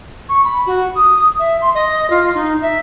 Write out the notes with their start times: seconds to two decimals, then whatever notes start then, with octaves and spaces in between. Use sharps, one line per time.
0.29 C#6
0.44 B5
0.67 F#4
0.95 D#6
1.39 E5
1.61 C6
1.75 D#5
2.10 F4
2.35 D#4
2.62 E5